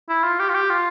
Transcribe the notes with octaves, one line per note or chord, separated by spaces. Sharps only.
E4
F4
G4
F4
G4
F4